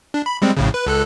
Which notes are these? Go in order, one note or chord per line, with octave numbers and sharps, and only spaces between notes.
D4
B5
G3 G#3 C4
A#1 A2 C#3
B4
C#2 A4 F#6